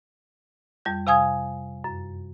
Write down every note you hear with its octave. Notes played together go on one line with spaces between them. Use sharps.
F2 G3 G6
C3 F5 G#5 D#6 G#6
F#2